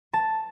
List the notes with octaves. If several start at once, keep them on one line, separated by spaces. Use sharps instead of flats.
A5